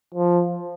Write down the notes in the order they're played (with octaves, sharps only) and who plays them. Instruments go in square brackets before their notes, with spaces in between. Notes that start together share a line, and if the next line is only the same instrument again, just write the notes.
[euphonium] F3